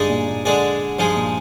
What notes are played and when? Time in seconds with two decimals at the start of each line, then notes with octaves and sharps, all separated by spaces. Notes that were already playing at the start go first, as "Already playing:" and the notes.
Already playing: G2 D3 G#3 D#4 G#4 D5
0.09 A#2
0.28 A#2
0.45 D3 G#3 D4 G#4 D5
0.98 G2 F3 G#3 D#4 G#4
1.16 A#2